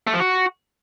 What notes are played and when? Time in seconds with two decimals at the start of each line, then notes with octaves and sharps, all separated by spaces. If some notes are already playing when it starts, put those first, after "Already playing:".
0.07 A3
0.14 F3
0.20 F#4